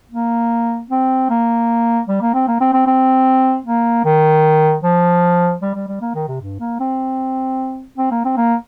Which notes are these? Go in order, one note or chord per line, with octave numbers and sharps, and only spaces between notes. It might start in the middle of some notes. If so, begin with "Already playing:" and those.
A#3
C4
A#3
G3
A#3
C4
A#3
C4
C4
C4
A#3
D#3
F3
G3
G3
G3
A#3
D#3
C3
G2
A#3
C4
C4
A#3
C4
A#3